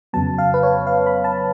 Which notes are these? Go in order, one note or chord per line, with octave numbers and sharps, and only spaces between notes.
F2 C#3 F#3 B3 A5
F5
B4
C#5
F5
B5
A5